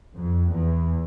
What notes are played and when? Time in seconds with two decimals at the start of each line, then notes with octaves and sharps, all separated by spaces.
0.16 F2
0.52 E2